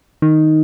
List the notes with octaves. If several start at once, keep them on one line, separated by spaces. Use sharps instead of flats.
D#3